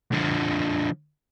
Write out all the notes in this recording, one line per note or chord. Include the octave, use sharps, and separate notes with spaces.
D3 F3